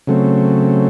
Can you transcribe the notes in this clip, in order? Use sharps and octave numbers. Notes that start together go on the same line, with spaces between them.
C#3 F#3 A3 C4